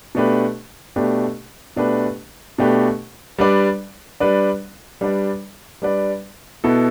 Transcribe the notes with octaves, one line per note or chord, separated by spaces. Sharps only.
B2 A3 D4 G4 B4
B2 A3 D4 G4 B4
B2 A3 D4 G4 B4
B2 A3 D4 G4 B4
G3 D4 B4 D5
G3 D4 B4 D5
G3 D4 B4 D5
G3 D4 B4 D5
B2 B3 E4 A4